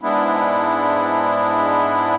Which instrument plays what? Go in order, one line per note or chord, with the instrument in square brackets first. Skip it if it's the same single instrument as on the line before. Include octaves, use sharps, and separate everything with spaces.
[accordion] G#2 G#3 B3 D4 E4